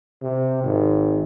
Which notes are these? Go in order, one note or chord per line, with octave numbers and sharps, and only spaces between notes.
C3
G#1